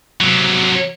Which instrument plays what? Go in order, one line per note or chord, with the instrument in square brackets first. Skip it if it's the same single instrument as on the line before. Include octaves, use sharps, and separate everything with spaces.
[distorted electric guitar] C3 F#3